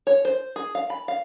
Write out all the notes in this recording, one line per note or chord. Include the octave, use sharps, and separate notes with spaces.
C#5
C5
G#4
F5
B5
F5